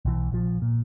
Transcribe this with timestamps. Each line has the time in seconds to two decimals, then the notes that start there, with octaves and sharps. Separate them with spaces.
0.05 B1 E3
0.31 A#1 F3
0.62 A#2